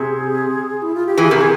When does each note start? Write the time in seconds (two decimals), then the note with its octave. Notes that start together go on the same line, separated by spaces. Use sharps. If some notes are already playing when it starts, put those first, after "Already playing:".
Already playing: C3 G#4
0.82 E4
0.94 F4
1.06 G4
1.18 E3 G#4
1.30 C3 A#4
1.41 G#4